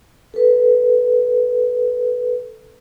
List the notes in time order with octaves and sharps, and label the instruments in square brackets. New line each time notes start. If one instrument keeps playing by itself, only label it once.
[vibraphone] A4 B4